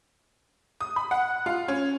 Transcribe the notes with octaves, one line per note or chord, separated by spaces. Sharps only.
D#6
B5
F#5
F4
C#4